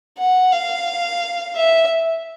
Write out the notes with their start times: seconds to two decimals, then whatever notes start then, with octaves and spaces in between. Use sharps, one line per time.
0.18 F#5
0.53 F5
1.56 E5